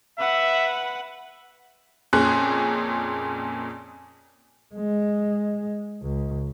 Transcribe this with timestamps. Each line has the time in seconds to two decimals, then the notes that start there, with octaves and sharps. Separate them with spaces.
0.19 B4 E5 F#5
2.13 F2 A#2 C#4 G#4 C6 F#6
4.75 G#3
6.02 C#2